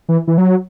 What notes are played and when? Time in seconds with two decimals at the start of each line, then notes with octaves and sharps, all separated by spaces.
0.09 E3
0.27 E3
0.38 F#3